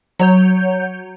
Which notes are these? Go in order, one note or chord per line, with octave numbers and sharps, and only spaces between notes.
F#3 C#5 G6